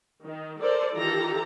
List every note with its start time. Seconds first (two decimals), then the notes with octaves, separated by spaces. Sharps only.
0.23 D#3
0.61 A4 A#4 C5 D5
0.95 D#3 E3 F4 G4 A4 A#5